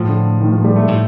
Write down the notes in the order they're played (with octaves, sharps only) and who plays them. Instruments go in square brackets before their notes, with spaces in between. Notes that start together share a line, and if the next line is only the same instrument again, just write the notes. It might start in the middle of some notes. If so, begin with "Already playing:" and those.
Already playing: [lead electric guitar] A2 [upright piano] F3
[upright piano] D3
D#3
F3
G3
A3
[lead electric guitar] A2